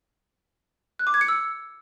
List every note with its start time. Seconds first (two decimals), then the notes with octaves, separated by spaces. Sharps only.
0.99 F#6
1.07 D6
1.14 G#6
1.21 C#7
1.28 E6